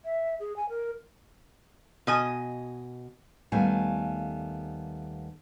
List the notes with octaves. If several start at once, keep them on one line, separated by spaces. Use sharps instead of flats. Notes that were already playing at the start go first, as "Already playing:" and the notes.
E5
G#4
G#5
A#4
B2 D#5 G#5
D#2 G3 A3 B3 F5 G#5